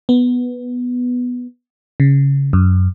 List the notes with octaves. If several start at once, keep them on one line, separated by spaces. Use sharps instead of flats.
B3
C#3
F#2